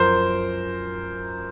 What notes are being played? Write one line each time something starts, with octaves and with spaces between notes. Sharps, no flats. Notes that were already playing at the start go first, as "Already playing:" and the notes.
Already playing: F#2 F3 A#4 C5